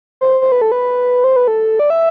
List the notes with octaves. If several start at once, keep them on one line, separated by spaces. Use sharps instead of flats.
C5
C5
B4
A4
B4
C5
B4
A4
D5
E5